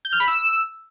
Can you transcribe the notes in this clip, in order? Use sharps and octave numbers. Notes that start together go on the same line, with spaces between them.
G6
F6
B5
E6